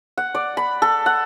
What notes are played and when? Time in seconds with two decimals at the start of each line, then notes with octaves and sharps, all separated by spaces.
0.17 F#5
0.35 D5
0.57 B5
0.82 A4
1.06 F#5